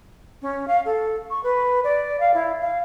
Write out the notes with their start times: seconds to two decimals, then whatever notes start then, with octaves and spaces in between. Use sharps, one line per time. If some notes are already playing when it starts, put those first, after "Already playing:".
0.42 C#4
0.68 F5
0.85 A4
1.30 C#6
1.43 B4
1.84 D5
2.20 F5
2.34 E4
2.61 F5